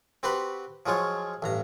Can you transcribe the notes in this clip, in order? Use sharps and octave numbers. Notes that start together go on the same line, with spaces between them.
C4 F#4 G4 B4 B5 C6
F3 F#3 G#3 F4 C#5
A1 G2 A#5